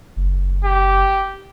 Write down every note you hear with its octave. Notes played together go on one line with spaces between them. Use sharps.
F#1
G4